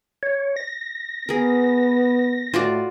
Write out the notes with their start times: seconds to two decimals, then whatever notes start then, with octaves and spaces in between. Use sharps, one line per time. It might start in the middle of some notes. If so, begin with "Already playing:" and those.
0.23 C#5
0.57 A#6
1.29 B3 G#4 A#4
2.54 A2 F4 F#4 D5